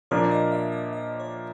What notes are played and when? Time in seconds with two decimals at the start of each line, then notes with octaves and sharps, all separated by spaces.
0.11 A#2 F3 A#3 D4 C#5
0.31 D#5
0.52 E5
0.72 D#5
0.93 D#5
1.20 C#5